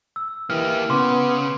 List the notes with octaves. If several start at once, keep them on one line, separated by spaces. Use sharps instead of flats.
E6
E3 A#3 G4 F6
C#3 B3 C6 D6